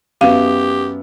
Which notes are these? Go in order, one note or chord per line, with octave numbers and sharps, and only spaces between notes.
F#2 B3 G4 F5